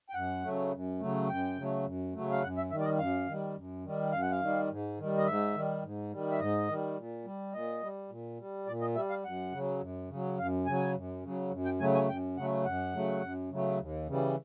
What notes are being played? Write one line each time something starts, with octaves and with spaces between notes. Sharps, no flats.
G5
F#2 F#5
C#3 F#3 A3
F#2
C#3 F#3 A3
F#2 G5
C#3 F#3 A3
F#2
C#3 F#3 A3
F5
F#2 F#5
E5
D#3 G3 E5
D5
D#5
F#2 F5
D#3 G3
F#2
D#3 G3
F#2 F5
F#5
F5
D#3 G3
G#2
D#3 G3
D#5
G#2 E5
D#3 G3
G#2
D#3 G3
E5
G#2 D#5
D#3 G3
A#2
G3
A#2 D#5
G3
A#2
G3
A#2 D5
D#5
G3 E5
F5
F#2 F#5
C#3 F#3
F#2
C#3 F#3
F#2 F5
C#3 F#3 G#5
F#2
C#3 F#3
F#2
G5
C#3 F#3 A3 G#5
G#5
F#2 G5
C#3 F#3 A3 F#5
F#2 F#5
C#3 F#3 A3
F#2
C#3 F#3 A3
D#2
C#3 E3 G3